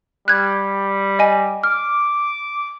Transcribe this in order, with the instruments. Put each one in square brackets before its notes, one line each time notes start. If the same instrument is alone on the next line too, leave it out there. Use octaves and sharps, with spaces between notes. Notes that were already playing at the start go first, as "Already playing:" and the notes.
[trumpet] G3 [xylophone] F#6 G#6
[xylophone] D#5 G#5
[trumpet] D6 [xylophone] F6